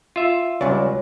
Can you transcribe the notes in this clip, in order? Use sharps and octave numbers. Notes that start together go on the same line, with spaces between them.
F4 E5
C#2 F#3 G3 C#4 D5